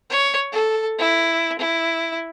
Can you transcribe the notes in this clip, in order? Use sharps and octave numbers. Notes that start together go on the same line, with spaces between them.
C#5
A4
E4
E4